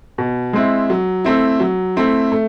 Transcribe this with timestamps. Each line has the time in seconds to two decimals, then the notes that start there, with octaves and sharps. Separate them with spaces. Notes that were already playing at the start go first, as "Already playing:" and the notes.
0.18 B2
0.53 G#3 C4 E4
0.90 F#3
1.25 A3 C4 E4
1.60 F#3
1.96 A3 C4 E4
2.32 A3